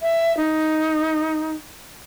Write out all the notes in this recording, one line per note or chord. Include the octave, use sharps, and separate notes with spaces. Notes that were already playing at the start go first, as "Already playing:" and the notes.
E5
D#4